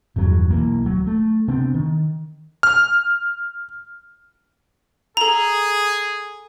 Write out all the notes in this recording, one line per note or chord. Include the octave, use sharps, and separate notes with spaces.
D#1 E2 G2 F#3
B1 E3 A#3
D1 F#3
A3
C3 B3 C4 D4
D#3
F6
G#4 A4 A#5